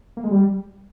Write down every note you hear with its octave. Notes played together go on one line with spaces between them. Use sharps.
A#3
G#3
G3